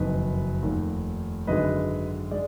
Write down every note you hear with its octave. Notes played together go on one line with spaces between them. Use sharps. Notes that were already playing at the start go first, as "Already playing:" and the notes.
Already playing: F#1 F2 D#3 F#3 B4 D#5
F1 D#2 D#3
G#1 F#2 D3 G#3 B4 D#5
G#3 D5